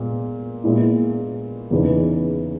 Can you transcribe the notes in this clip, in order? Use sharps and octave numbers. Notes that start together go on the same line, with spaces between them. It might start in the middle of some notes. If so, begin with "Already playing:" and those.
Already playing: A#2 G#3 B3
A#2 G#3 B3 E4
E2 C#3 E3 B3 D#4